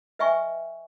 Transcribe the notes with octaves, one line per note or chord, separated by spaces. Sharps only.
B4 D#5 E5 G5 G#5 C#6